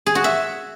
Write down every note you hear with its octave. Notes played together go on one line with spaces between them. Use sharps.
G#4
F#4
E5